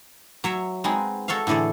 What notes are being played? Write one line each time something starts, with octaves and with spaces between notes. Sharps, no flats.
F#3 C#5 E5
G#3 B3 C4 D#4 G#4
F#4 A4 C#5 E5 F5
A2 D3 E3 G#4 A4